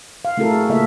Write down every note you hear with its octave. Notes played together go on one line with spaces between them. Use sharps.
F5
A3 C4 E4 F#4 A4 A#4
G#4
C#3 A#3 F4 A4 D#5 E5